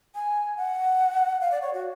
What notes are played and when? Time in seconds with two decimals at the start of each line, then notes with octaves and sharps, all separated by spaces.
0.15 G#5
0.57 F#5
1.41 F5
1.52 D5
1.62 C#5
1.73 F#4